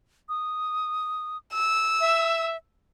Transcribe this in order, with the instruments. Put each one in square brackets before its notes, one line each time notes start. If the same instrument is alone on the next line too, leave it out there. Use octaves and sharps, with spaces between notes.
[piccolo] D#6
[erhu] E6
[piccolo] E5